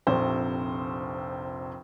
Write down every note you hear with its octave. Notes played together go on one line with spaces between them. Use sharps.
F1 A#1 C3 C5